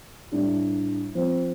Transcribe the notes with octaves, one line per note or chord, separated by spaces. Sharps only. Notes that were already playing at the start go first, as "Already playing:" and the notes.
A2 G3 D4
F3 C4